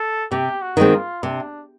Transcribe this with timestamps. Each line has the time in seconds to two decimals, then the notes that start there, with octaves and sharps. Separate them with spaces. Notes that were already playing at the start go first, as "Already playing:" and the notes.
Already playing: A4
0.31 C3 G4
0.62 F#4
0.77 D#3 G#3 C4
0.92 F4
1.23 C3 D4